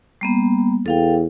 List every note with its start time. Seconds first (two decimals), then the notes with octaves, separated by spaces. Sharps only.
0.21 G3 A#3 B3
0.86 E2 A4 F5 G5